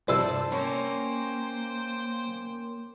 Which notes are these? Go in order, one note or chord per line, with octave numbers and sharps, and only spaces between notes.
C2 G2 F3 D4 E4 A4 C5 A5
A#3 C#4 C5 G5